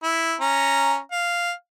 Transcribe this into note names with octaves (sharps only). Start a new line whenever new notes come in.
E4
C#4 A#5
F5